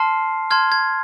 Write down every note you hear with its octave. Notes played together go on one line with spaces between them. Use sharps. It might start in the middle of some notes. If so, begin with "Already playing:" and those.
Already playing: A5 C6 F6 C7
A5 C6 F6 G#6
G#6